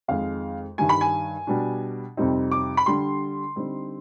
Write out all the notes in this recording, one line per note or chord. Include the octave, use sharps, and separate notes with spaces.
F2 D#3 G#3 F5
G2 D#3 G3 G#5
B5
G#5
B2 G3 D4
F2 C3 G3 C4 D#4
D6
B5
D3 G3 D4 C6
D3 G3 C4 D#4